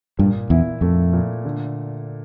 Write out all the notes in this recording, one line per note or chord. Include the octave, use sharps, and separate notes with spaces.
G2 A#2
E2 E4
F2 A3
A#2
D3